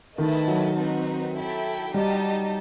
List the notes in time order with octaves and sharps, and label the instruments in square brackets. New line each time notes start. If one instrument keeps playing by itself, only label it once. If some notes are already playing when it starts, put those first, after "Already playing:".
[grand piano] D#3 [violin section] A3 E4 B4 D#5 A5
[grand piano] F#3
[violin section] C4 D#4 F#4 B4
E4 A4 E5 G5
[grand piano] G3 [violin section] D#4 G4 D#5 A5